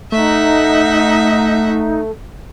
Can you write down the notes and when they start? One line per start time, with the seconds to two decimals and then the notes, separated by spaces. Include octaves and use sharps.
0.12 A3 D#4 E5 F#5